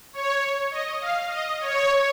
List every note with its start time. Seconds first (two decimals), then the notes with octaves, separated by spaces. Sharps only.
0.13 C#5
0.71 D#5
1.01 F5
1.30 D#5
1.60 C#5